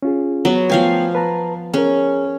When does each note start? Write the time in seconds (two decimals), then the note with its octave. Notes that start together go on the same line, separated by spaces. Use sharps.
0.03 C#4 F4 G#4
0.45 F#3 B3
0.70 F3 A3 B3 F5 G5 G#5
1.15 B4 A5 A#5
1.74 C#4 G#4 A#4